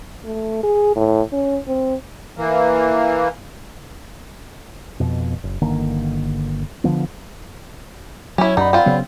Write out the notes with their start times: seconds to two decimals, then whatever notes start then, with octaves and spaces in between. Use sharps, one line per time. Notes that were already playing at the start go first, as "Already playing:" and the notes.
0.24 A3
0.63 G#4
0.96 A2
1.32 C#4
1.68 C4
2.37 E3 A#3
5.00 F2 B2
5.44 F#1
5.61 G1 D3 D#3 A#3
6.84 D3 D#3 F3 B3
8.38 F#3 C#4 E4
8.57 F#2 D#4 D5 F#5 B5
8.73 C4 F4
8.86 C#3 F#3 B3